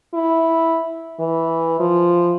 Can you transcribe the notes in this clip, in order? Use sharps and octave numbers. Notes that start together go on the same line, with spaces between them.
E4
E3
F3